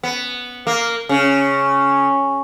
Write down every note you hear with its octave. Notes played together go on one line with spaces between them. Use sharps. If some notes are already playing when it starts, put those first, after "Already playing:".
B3
A#3
C#3